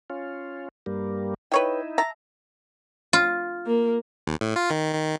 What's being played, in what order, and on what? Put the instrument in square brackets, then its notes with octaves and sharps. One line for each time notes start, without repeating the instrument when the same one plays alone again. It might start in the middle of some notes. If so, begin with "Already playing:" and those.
[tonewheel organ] C#4 F4
G2 G3 A#3
[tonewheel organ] D#4 E4 [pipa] B4 C#5 G5
[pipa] E5 A5 A#5
[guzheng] F4
[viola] A#3
[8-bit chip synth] D#2
A2
F4
D#3
D#3